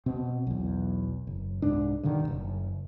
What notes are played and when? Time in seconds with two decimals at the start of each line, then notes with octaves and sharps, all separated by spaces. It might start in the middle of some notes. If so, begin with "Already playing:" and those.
0.06 B2 C4
0.47 B1 E2
1.27 F#1
1.62 C2 G#2 D4
2.03 G2 B2 D3 D#3
2.24 F#1 C2